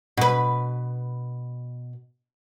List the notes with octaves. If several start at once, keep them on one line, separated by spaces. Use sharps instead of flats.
B2 B4